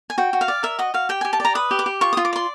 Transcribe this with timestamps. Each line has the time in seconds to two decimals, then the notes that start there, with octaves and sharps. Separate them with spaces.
0.10 G#5
0.18 F#4 G5
0.33 F#4
0.41 F5
0.48 D5
0.63 A#4 E5
0.79 F#4 D#5
0.94 F#4 F5
1.09 G4 G5
1.21 G4 G#5
1.33 A5
1.40 D5 A#5
1.55 B4 D#6
1.71 G4
1.79 D6
1.86 G4
2.01 F4 C#6
2.13 F4 D#6
2.25 D6
2.33 D5 C6